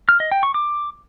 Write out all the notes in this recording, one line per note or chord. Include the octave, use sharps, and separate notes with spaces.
F6
D#5
G5
C#6
D6